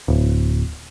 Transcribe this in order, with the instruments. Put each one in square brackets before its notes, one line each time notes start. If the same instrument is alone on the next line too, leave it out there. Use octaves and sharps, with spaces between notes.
[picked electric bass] D1